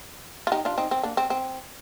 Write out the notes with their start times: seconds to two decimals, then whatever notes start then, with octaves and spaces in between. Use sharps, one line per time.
0.47 F4
0.52 D#4 G4
0.65 D4 F4
0.78 C4 D#4
0.91 C4
1.03 A#3 D4
1.17 C4
1.30 C4